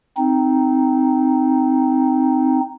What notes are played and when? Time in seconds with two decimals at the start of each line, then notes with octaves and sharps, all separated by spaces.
0.17 C4 D#4